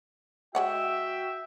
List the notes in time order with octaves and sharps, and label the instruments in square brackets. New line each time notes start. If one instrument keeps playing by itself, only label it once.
[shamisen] G#3 C#5 F#5 [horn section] F#4 E5 G5